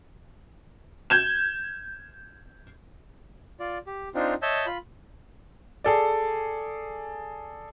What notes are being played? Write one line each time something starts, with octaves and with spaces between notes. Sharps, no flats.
G6 G#6 E7
F4 D5
G4
C4 D4 D#4 F4
C#5 D#5 E5 A5 E6 G6
F4 B5
G#4 A4 D5